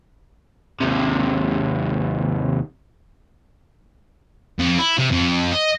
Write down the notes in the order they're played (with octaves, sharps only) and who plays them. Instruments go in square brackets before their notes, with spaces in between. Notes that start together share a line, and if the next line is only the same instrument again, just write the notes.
[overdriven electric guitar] D#2 C3
[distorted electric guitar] F2
E4
C3
F2
D#5